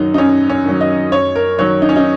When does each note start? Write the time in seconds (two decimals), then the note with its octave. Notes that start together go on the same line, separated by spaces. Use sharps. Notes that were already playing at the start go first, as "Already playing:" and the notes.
Already playing: F#2 D#3 F#3 D#4
0.14 D#4
0.18 F#2 C#4
0.50 C#4
0.66 D#3 F#3
0.81 D#5
1.12 F#2 C#5
1.36 A#4
1.59 D#3 F#3 C#5
1.82 D#4
1.89 C#4
1.96 D#4